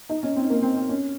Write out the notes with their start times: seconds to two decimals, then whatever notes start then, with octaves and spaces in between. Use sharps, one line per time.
0.09 D#4
0.23 C#4
0.36 C4
0.50 A#3
0.62 C4
0.76 C4
0.89 C#4